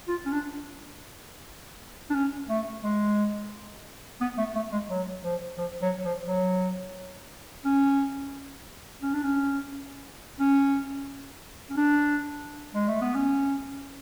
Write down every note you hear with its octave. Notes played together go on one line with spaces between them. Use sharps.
F4
C#4
D4
D4
C#4
A3
G#3
B3
A3
A3
G#3
F#3
F3
F3
F#3
F3
F#3
C#4
C#4
D4
C#4
C#4
C#4
D4
G#3
A3
B3
C#4